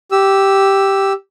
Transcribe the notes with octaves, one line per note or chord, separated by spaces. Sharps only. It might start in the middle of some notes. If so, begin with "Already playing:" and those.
G4 E6